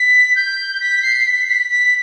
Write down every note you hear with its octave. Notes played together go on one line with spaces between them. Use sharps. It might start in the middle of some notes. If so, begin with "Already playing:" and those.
Already playing: B6
G6
B6
C7
B6
B6
B6